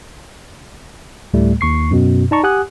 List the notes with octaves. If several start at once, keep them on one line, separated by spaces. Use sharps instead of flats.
D2 A2 G3 A3
D#2 C#6 C7
F#2 B2
D#4 D5 A5 A#5 C#6
G4 F#5 G#5 D#6 F#6